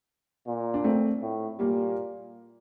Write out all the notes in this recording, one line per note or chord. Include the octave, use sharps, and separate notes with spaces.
A#2
D4
A3 C4
A2
A#2 G3 A#3